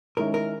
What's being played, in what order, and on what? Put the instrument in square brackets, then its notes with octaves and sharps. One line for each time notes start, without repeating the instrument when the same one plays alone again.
[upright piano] D#3 G#3 C#4 E4 [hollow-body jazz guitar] A#4
[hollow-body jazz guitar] A#4